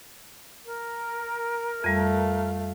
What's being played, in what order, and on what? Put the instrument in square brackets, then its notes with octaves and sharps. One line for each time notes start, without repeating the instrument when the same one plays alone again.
[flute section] A#4
[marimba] F2 G3 [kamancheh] A3 F5